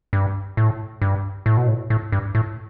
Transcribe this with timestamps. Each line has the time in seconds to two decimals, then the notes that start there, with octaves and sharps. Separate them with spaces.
0.13 G2
0.57 A2
1.02 G2
1.46 A2
1.57 B2
1.68 A2
1.90 A2
2.12 G2
2.35 A2